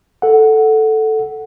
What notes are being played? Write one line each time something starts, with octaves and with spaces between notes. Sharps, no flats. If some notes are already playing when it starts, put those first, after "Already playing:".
A4 F#5